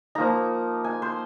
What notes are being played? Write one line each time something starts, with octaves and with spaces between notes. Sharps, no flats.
F3 A#3 D#4 A#5
G#5
C5